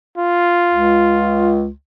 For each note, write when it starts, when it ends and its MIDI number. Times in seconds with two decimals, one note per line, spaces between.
0.18 1.56 65
0.71 1.71 37